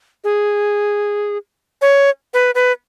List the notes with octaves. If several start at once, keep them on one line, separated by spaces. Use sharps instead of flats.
G#4
C#5
B4
B4